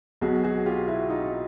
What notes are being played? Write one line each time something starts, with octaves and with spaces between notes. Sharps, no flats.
B1 B2 F#3 F#4 G#4
F#4 G#4
F4 G4
E4 F#4
D#4 F4